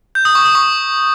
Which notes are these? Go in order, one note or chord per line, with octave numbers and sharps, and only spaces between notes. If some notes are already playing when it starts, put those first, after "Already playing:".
G6
D#6
C#6
D#6
C#6